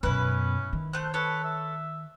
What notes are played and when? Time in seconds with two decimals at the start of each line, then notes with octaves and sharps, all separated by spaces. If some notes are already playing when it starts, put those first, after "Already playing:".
0.03 F#2 B2 C#4 E4 B4
0.73 D#3
0.93 A3 C5 F#6
1.14 A4 B4 C#5
1.44 E5